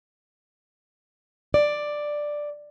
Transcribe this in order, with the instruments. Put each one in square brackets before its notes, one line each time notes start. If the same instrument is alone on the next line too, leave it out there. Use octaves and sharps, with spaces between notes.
[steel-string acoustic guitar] D5